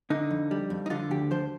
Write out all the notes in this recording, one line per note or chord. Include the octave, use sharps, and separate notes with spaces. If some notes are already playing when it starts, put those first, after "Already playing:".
D3 D#4
F2
G3
F2
D#4
D3 F4
D2 G4
F3 C5